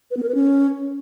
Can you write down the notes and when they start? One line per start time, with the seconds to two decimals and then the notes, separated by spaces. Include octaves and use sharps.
0.11 B4
0.17 B3
0.23 A#4
0.29 B4
0.35 C#4